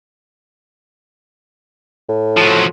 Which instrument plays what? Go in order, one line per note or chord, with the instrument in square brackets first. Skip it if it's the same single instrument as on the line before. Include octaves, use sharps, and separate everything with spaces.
[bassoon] A2
[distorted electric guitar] F3 F#3